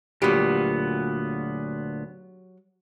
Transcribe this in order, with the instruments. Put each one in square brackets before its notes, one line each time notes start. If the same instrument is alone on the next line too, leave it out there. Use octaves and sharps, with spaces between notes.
[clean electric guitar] D2 A#2 B3 [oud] F#3 G4